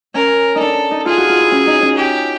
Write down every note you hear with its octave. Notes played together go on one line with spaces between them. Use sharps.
C#4 A#4
D4 D#4 A4
D#4
F4 G#4
F#4
F4
E4
C#4
D#4
C#4
G4